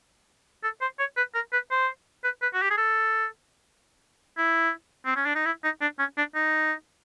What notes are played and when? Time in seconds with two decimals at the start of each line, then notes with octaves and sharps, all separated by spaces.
0.63 A4
0.81 C5
0.99 C#5
1.17 B4
1.35 A#4
1.53 B4
1.71 C5
2.24 B4
2.42 B4
2.54 F#4
2.62 G4
2.70 G#4
2.77 A4
4.38 E4
5.06 C4
5.16 C#4
5.25 D4
5.35 D#4
5.45 E4
5.64 D#4
5.81 D4
5.99 C#4
6.17 D4
6.35 D#4